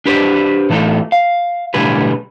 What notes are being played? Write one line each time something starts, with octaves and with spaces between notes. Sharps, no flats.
D4 G4 B4 C5 D5
A2 E3 A3 D#4 F4 A4
F5
B1 A2 D3 G3 G#4 B4